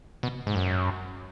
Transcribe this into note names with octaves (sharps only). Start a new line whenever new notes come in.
B2
G#2
F#2